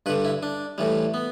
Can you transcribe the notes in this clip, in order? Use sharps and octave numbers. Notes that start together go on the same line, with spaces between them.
G2 D3 G3 B4
E4
D4
A2 E3 G3
B3